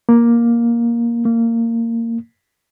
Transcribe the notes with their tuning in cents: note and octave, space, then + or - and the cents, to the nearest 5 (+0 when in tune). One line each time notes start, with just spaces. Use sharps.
A#3 +10
A#3 -20